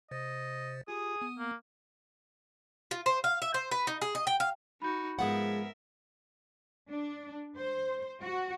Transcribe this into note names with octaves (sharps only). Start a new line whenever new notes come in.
C3 C5 D#5 A6
F4 G4 G#4 D#6
B3
A#3
F4
C5
F5
E5
C5
B4
D#4
G#4
D#5
G5
F5
D#4 F#4 B5 G6
G#2 F3 G#3 B3 A#4 E5 F#5
D4
C5
F#4